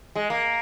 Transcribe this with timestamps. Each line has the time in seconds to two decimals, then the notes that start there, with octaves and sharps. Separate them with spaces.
0.16 G#3
0.30 A#3